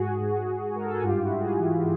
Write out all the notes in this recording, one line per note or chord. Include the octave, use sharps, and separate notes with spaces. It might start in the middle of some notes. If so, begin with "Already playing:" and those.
Already playing: G#2 F#4 G#4
G#2
G#2
G#2 A#4
A4
G#4
G2 F4 G4
E4 F#4
G2
F#4 G#4
E3